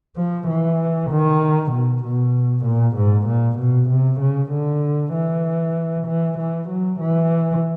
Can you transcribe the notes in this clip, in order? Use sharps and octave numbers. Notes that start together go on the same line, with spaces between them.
F3
E3
D#3
B2
B2
A#2
G#2
A#2
B2
C3
C#3
D3
E3
E3
E3
F#3
E3